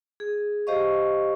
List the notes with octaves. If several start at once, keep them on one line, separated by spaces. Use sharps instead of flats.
G#4
G4 C5 D#5 F5 C#6